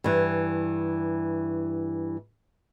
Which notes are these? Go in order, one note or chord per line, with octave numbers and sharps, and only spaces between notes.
G2 E3